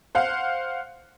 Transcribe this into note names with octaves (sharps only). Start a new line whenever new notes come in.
C5 F5 F#5